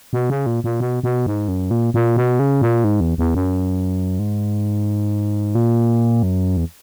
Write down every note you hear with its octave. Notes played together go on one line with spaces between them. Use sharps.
B2
C#3
A#2
A#2
B2
B2
G#2
F#2
A#2
A#2
B2
C#3
A#2
G#2
E2
E2
F#2
G#2
A#2
F#2
E2